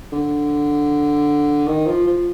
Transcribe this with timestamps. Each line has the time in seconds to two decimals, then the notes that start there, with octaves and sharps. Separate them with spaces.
0.12 D3
1.67 D#3
1.87 F3
2.07 F3